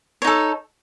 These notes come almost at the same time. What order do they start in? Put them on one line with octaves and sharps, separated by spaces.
C#5 D#4 A4